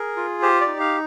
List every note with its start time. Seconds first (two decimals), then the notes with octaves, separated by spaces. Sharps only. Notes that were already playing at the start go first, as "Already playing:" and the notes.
Already playing: G#4 A#4
0.16 F4
0.42 G4 C5
0.61 D5
0.67 D#4
0.80 F5